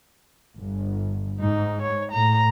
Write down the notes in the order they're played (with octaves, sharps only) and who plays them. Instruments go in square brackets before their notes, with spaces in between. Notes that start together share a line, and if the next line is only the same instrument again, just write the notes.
[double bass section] G1
[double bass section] G#2 [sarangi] D#4
[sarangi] C#5
[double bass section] A2 [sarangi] A#5